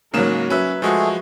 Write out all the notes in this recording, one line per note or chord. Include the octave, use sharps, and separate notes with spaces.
G#2 C#3 F#3 A#3 A#4 E7
F#3 C#4 B4 E5
F3 G#3 A3 F#4 G#4